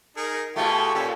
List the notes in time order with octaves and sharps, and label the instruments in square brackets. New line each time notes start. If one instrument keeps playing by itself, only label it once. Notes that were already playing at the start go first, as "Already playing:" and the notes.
[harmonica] D#4 G#4 A#4
[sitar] B2 A3 [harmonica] F4 G4 G#4
[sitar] A#2 [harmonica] C#4 G4 A4